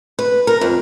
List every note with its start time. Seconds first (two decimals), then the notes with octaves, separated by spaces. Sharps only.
0.19 B4
0.47 A#4
0.61 F2